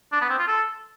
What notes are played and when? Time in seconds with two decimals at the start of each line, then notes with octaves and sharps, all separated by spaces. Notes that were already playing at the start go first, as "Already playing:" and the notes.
0.12 D4
0.21 B3
0.30 C4
0.38 F4
0.47 A4